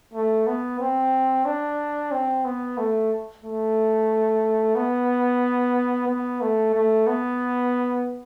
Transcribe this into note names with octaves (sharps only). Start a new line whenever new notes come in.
A3
B3
C4
D4
C4
B3
A3
A3
B3
B3
A3
A3
B3